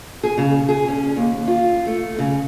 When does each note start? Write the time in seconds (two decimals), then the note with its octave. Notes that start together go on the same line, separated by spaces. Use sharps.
0.23 G#4
0.38 C#3
0.69 G#4
0.88 C#4
1.17 D#2
1.48 F4
1.87 A3
2.19 C#3